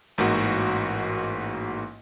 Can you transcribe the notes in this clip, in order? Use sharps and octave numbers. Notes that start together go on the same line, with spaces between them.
A1 G#2 A#3 F#4